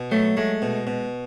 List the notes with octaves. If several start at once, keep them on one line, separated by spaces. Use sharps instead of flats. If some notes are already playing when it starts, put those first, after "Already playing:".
Already playing: B2
F#3 A3
G#3 A3
B2
B2